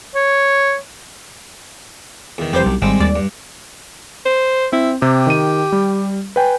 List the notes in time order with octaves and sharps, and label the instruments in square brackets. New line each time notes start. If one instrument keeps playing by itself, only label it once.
[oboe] C#5
[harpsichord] E2 D#3
[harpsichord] C2 G4 [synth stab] F2 E3 C5
[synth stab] B1
[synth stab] G#1 [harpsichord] G3 G#3 C4
[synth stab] D#2 D5
[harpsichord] G2
[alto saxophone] C5
[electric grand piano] C4 [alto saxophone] E4
[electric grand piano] C3 [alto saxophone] G4
[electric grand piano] D#3 D#7
G3
B4 G5 G#5